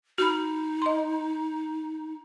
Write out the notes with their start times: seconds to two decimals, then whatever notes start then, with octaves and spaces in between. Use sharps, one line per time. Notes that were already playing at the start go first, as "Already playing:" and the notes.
0.18 D#4 F#4 B5
0.82 D#5 C6